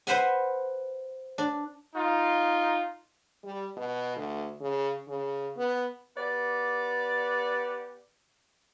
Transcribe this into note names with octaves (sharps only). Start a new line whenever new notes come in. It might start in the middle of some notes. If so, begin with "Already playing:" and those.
B4 C5 E5 F#5 G#5
D4
D#4 F4
G3
B2
D2
C#3
C#3
B3
B3 G4 D5